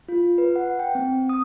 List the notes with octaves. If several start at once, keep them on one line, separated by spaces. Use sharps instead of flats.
F4
B4
F#5
G5
C4
D#6